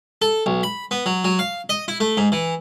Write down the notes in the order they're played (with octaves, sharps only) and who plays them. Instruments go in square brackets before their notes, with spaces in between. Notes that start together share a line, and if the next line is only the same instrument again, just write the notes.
[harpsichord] A4
B1
B5
B3
F#3
F#3
F5
D#5
E4
A3
G#2
E3